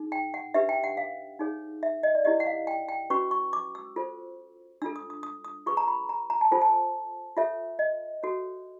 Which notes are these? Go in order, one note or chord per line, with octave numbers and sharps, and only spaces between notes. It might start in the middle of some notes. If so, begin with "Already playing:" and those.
Already playing: D#4 G#4
G5
F#5
D4 G4 B4 E5
G5
F#5
F5
D#4 G#4 C#5
E5
D#5
D5
E4 G4 B4 D#5
F#5
F5
G5
G5
C#4 F#4 B4 C#6
C#6
D6
E6
F4 A4 C5
D4 F4 A4 E6
D#6
D#6
D#6
D#6
F4 G#4 B4 C#6
A#5
B5
A#5
A#5
A5
F4 A4 C5 G#5
A5
F4 A4 C#5 E5
D#5
F#4 A4 C#5